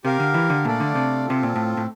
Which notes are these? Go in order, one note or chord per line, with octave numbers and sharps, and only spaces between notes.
C3 G4 A#4 F5
D3
E3
D3
A#2 A3 D4 A4 D5 F5
D3
C3
C3 C4 F4 A4
A#2
A2
A2